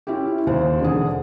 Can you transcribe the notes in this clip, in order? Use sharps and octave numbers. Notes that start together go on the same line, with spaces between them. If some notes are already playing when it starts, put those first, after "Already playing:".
C#4 E4 F4 G4
D#2 C5
E1 D3 G#4